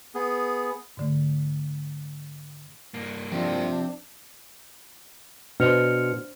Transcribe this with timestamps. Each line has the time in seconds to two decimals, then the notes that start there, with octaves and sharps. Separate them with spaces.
0.15 B3 G#4
0.97 G#2 D3 A3
2.94 G2 A#3
3.32 F3 C4 D4 G4
5.60 B2 D4 C5 F6 C#7 F7